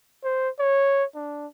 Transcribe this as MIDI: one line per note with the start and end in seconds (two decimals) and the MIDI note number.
0.24 0.49 72
0.59 1.04 73
1.15 1.47 62